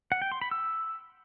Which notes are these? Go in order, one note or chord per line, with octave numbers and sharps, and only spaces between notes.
F#5
G5
C6
B5
E6